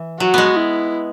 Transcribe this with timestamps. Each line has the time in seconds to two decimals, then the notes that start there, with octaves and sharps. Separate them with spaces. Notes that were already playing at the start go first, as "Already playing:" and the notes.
Already playing: E3
0.20 F#3 F#4
0.34 G#3 B3
0.57 E4